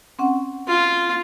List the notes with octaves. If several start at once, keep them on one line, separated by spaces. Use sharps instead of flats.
C4 C#4 F#5
F4